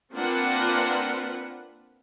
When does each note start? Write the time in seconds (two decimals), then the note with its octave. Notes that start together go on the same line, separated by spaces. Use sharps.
0.12 A#3 C4 D4 F4 B4 F#5